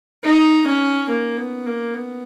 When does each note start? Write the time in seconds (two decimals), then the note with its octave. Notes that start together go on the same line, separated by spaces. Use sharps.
0.24 D#4
0.67 C#4
1.09 A#3
1.37 B3
1.66 A#3
1.94 B3